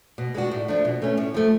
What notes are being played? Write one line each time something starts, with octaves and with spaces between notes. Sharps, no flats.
B2
G#3 D4 F#4
A2
F3 A3 D4
B2
A3 C#4
A2
F3 A3